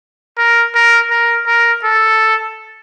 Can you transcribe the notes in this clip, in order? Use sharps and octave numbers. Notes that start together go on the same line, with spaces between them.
A#4
A#4
A#4
A#4
A4